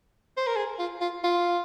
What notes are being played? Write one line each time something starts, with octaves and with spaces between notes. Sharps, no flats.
C5
A#4
G#4
F4
F4
F4